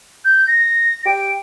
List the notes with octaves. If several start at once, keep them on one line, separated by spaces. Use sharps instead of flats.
G6
A#6
G4 D7